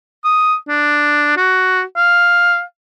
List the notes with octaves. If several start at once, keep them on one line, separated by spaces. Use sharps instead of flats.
D#6
D4
F#4
F5